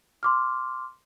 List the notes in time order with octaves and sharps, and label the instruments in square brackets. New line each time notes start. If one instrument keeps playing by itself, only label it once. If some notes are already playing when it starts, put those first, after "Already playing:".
[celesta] C6 D6 F6